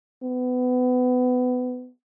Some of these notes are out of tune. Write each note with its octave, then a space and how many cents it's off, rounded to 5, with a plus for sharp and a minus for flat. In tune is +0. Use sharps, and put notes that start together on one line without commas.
B3 +25